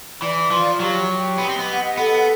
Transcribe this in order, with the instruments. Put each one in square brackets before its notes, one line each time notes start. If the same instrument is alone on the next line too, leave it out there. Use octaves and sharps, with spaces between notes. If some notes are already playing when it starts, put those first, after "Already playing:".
[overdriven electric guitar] E3 [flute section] D5
[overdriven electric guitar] F3 [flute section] F4
[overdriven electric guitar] F#3 [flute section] G4
[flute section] G4
[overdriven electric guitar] B3 [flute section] D#5
[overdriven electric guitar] C4
B3
[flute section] F#5
[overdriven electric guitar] B3 [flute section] A4